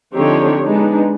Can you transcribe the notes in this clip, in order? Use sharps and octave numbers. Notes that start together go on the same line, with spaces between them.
D3 F3 C4 D#4 G4 C#5
G#3 B3 D4 D#4